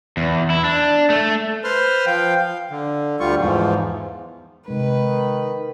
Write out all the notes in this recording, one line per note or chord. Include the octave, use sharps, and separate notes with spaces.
E2
E4
D4
A3
B4 C5 C6 F6
F3 F5 G5
F5
D3
D2 G3 F4 C#6
E2 G#2 F3
C3 D#3 G#3 B4